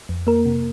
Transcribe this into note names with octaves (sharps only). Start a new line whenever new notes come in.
F2
A#3 A#4
C3